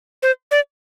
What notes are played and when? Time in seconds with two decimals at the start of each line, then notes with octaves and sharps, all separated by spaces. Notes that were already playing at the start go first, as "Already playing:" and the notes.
0.23 C5
0.51 D5